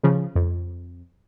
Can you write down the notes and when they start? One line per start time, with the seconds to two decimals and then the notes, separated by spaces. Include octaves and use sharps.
0.03 C#3 F3
0.35 F2